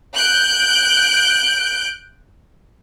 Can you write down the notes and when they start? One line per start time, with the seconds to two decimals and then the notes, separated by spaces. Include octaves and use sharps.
0.14 F#6 G6 D7